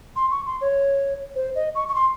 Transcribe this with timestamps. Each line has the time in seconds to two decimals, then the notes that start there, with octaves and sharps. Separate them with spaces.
0.16 C6
0.31 C#6
0.46 C6
0.61 C#5
1.35 C5
1.55 D#5
1.75 C#6
1.88 C#6
1.95 C6